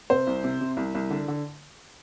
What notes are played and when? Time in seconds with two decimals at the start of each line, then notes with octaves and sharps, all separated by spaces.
0.10 C3 C5
0.27 C2
0.44 C3
0.61 C3
0.77 C2
0.95 C2
1.10 D3
1.28 D3